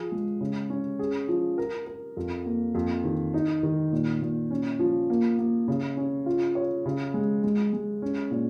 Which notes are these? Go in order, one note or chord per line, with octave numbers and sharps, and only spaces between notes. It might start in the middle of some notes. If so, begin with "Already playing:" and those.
Already playing: F3 G#4
G#3
C#3
C#4
G#4
F3
A#4
A#4
F2
A#3
F2
D#3
D#4
D#3
A#2
A#2
C#4
F3
A#3
A#3
C#3
C#4
F4
C#5
C#3
G#3
G#3
G#3
C#4
A#2